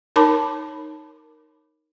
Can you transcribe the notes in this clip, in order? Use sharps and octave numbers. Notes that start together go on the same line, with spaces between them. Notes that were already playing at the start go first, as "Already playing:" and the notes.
D#4 A#4 C#5 A5 B5 D6